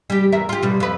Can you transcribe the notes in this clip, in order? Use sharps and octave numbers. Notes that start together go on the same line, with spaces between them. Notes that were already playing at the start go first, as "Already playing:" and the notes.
G3 G4
E2 A#4 E5
F4 G4
B2 G3
F2 B4